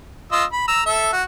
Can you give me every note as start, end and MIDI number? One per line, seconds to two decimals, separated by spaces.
0.32 0.44 65
0.32 0.44 75
0.32 0.44 88
0.53 0.67 83
0.68 0.82 82
0.68 0.82 88
0.86 1.11 69
0.86 1.11 76
1.13 1.23 66